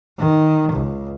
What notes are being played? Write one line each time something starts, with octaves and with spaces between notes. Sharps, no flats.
D#3
C#2